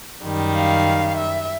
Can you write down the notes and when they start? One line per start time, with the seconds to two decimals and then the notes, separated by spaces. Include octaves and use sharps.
0.24 F#2 D#3 G3
0.55 F5
1.16 E5